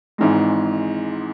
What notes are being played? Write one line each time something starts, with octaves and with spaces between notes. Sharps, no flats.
G#1 G#2 E3 G#3